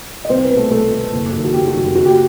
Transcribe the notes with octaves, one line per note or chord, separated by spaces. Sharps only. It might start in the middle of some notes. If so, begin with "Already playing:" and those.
D#5
C2 C4 C5
B3 B4
B2
A3 A4
C2 A3 A4
B2
F#1
F#2 D#3
F#4
F#1 G4
F#4
F#2 D#3
G4
F#1 F#4
G4